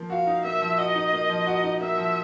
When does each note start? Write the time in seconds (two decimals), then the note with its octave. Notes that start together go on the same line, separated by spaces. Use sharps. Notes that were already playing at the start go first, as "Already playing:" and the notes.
Already playing: F3 A#3
0.10 F#4 F5
0.27 D#4
0.44 A#3 E5
0.61 F3
0.78 F#4 D#5
0.95 D#4
1.13 A#3
1.30 F3
1.46 F#4
1.64 D#4
1.81 A#3 E5
1.98 F3